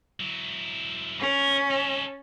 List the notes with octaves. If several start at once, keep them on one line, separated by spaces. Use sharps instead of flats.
F#3 E4
C#4 A#4 B4
D#4 A4